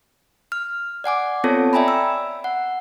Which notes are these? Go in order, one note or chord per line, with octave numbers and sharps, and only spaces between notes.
F6
D5 F#5 G#5 D6
B3 C4 F4 A4 C#5 A5
D5 E5 G5 G#5 A#5 B5
E6
F#5